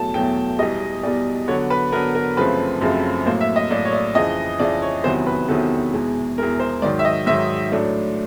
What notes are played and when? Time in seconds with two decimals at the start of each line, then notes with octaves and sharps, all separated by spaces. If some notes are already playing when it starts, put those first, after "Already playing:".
Already playing: E2 B2 F#3 A3 A5
0.14 E2 B2 F#3 A3 G5
0.59 E2 B2 G3 D#5
1.03 E2 B2 G3 D5
1.48 D3 F#3 B3 C#5
1.70 B4
1.92 D3 F#3 B3 A#4
2.15 A#4
2.37 F#2 C#3 F3 A3 C4 B4
2.81 F#2 C#3 F3 A3 C4
3.26 A2 F#3 A#3 C5
3.41 E5
3.56 D#5
3.70 A2 F#3 A#3 D5
3.85 C#5
3.93 D5
4.15 F2 C#3 E3 D#5
4.60 F2 C#3 E3 D5
4.82 C#5
5.04 E2 C3 D#3 F#3 B3 C5
5.27 B4
5.48 E2 C3 D#3 F#3 B3 A4
5.93 E2 B2 G#3
6.38 E2 B2 G#3 A#4
6.60 C5
6.82 G#2 D#3 F#3 D5
6.99 E5
7.05 D#5
7.26 G#2 D#3 F#3 E5
7.71 A2 F#3 A3 D4